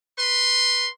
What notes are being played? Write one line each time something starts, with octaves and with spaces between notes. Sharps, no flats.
B4 C6